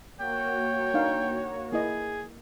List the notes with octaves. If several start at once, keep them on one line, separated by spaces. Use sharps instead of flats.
A#3 F#4 C#5 G5
D4 D#4 F5
A#3 E4 G#4 D#5